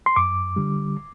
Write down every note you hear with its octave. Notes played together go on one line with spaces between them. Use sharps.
C6
F#2 D6
D3 G3